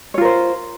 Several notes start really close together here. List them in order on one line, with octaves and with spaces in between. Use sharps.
C#5 F4 A#4 C5